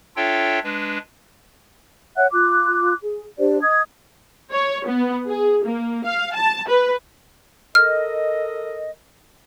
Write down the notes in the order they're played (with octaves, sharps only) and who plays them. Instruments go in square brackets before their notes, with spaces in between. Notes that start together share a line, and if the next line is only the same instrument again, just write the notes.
[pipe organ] D4 F4 A4 C#5 E5 G5
G#3 D4 B4
[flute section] C#5 E5 F#5 F#6
F4 D6 F#6
G#4
D4 G4 C5 D5
D#5 D#6 G#6
[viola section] C#5
B3
G#4
A#3
F5
A5
B4
[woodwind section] A4 A#4 D#5 [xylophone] F6